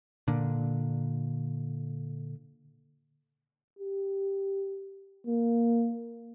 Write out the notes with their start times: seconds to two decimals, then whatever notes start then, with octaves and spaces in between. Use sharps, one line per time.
0.28 A#2 D3
3.79 G4
5.27 A#3